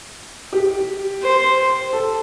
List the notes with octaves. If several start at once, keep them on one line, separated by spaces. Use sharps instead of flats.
G4
C5
A4